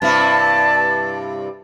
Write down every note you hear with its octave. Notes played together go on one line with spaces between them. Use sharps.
G2 C3 E4 A5